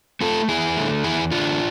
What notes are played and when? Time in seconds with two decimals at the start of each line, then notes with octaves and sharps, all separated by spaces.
0.21 A3 F4 A4
0.48 E2 E4 G#4
0.77 D3 A3
1.04 E2 E4 G#4
1.31 D3 A3 D4 F4